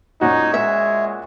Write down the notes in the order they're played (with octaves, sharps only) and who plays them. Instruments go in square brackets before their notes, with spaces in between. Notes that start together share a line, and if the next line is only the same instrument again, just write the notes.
[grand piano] A#2 C#4 F#4 [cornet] D#4 [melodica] C#5
[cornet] G#3 [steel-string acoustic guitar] E5